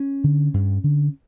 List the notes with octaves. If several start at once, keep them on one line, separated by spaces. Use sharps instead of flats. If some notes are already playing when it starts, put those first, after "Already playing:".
Already playing: C#4
D3
G2
D3